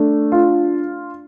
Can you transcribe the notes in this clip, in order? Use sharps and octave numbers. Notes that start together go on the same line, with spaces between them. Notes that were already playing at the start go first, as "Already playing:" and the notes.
Already playing: A3 D4
F4